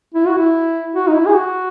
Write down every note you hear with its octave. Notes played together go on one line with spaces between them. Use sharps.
E4
F#4
E4
F#4
D#4
E4
G#4
F#4